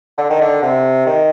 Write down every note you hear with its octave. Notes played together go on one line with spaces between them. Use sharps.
D3
D#3
D3
C3
D#3